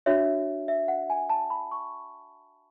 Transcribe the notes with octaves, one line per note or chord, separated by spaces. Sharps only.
D4 F#4 C#5 E5
E5
F#5
G#5
A5
B5
C#6